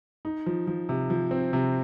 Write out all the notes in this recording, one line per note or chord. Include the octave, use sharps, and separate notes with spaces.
D#4
F3
F3
C3
F3
C4
C3